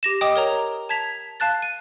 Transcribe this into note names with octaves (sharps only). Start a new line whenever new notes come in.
G4 A#6 E7
D#5 G5 D6 D#6
A#4 C#5 A#5 F7
A5 G#6 B6 F7
F5 A5 F#6 A6
D#7